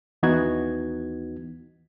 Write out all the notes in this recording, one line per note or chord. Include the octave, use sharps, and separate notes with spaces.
D#2 E3 B3 D#4 F#4 G#6